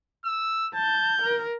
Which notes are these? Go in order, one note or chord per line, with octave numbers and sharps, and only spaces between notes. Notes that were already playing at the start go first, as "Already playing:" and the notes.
E6
A5 G6
A#4